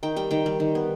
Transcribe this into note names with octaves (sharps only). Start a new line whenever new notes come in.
D#3 G5
G3 G5
D#3 G5
G3
D#3
B3